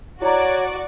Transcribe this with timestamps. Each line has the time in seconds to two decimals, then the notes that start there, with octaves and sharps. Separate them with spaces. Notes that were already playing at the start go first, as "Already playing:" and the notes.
0.22 E4 F#4 C#5 D5 A#5